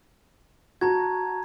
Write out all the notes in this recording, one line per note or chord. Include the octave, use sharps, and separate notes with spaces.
F#4 A5 A#5 G#6